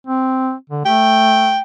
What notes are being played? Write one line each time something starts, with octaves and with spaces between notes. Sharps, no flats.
C4
D3
A3 G5